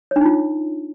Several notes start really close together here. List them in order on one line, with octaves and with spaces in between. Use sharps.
C#5 D4 D#4 F4